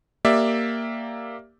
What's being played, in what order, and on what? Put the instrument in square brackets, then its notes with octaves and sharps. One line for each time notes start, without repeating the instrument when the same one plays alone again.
[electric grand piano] A#3 G4 D5 E5